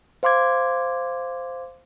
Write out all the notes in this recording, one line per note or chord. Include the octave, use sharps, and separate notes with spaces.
C5 F5 C6 D6 G#6